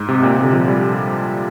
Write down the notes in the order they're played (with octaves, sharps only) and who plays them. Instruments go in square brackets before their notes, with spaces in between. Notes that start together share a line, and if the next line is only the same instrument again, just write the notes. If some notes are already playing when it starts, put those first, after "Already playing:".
Already playing: [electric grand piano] G#2
C3
A#2
C3
D3
F3
G3